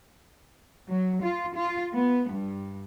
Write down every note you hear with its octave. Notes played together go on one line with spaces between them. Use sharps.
F#3
F4
F4
B3
G2